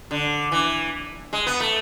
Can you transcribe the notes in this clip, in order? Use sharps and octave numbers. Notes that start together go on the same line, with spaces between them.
D3
E3
G#3
B3
A3